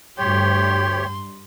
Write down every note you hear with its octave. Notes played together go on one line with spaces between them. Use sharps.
D2 G2 G4 C#5 G5 C6